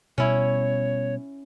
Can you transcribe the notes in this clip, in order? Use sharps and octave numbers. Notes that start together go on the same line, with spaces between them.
B2 G3 C#4 E4 C#5